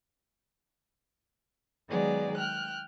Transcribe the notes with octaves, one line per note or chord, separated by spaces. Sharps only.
D#3 F#3 G#3 B3 G#4 D5
G5 F6 F#6